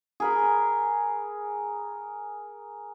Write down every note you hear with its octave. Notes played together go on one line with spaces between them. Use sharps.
G#4 A#4 B5